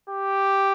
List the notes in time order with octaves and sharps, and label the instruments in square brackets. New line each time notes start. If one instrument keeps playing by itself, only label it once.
[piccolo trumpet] G4